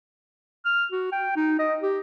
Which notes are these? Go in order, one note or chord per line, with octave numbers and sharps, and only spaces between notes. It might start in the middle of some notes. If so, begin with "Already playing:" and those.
F6
F#4
G5
D#4
D#5
G4